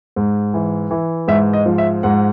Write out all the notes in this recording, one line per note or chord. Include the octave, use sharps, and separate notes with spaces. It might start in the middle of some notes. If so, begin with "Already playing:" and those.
G#2
E3
E3
G#2 E5
D#5
F3
E5
G#2 F#5